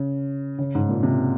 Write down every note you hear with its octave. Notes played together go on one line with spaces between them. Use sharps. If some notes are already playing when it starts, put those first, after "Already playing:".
Already playing: C#3
C#3
G#2
A#2
C3